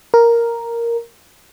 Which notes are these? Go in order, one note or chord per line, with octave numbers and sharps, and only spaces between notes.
A#4